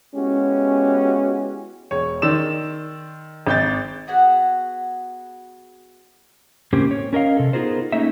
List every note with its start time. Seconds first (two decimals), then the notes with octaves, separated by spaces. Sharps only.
0.15 G#3 B3 C#4 E4 F#4 G4
1.91 E1 C#5
2.22 D#3 D5 C6 E6 E7
3.47 G#1 G6 A6
4.07 B3 F#4 G#4 F#5
6.73 A2 C#3 A#3 C4 C#4 G4
6.91 C#5
7.13 C#4 A#4 D#5 F5
7.37 C3 A4
7.53 B3 D#4 F4 G#4 A#4 C5
7.92 A3 A#3 C#4 D#4 D#5 E5